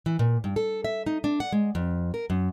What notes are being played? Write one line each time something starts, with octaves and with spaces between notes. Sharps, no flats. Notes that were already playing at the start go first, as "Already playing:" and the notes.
E3
A#2
G2
A4
E5
D#4
D4
F#5
G#3
F2
A#4
F#2